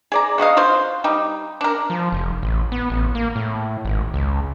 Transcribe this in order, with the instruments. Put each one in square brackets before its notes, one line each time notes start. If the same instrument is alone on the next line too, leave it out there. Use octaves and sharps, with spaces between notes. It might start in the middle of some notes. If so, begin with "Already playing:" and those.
[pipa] G#4 D5 A#5
B2 F#4 D#5 F5
F4 F#4 C5
G3 D#4
D4 A#4
[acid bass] F3
F1
A1
B3
A1
A#3
A2
G#1
C#2